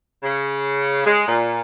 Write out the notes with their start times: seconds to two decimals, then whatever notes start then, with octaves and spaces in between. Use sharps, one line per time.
0.23 C#3
1.05 G#3
1.27 A#2